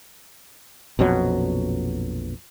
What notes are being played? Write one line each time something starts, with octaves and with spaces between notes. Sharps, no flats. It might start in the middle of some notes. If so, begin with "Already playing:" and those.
A#1 F2 B2 F#3